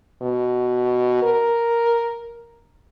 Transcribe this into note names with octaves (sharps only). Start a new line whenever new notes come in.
B2
A#4